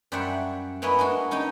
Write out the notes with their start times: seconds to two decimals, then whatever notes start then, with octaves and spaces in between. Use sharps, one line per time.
0.12 F#2 G3 C5 D5 E5 F#5
0.82 A#3 B3 C#4 E4 B4 D#5
0.99 G#3 D4 F#4
1.31 C#4 D#4 D#5 G5